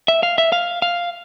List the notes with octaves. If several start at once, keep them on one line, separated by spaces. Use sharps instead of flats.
E5
F5
E5
F5
F5